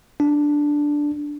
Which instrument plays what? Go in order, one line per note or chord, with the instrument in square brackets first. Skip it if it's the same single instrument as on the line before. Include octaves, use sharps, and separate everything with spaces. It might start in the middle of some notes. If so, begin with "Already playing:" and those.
[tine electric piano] D4